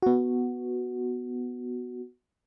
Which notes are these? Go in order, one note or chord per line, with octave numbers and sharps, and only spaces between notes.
B3 F#4